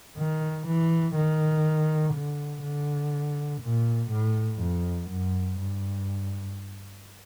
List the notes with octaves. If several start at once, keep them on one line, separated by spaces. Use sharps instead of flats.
D#3
E3
D#3
D3
D3
A#2
A2
F2
F#2
G2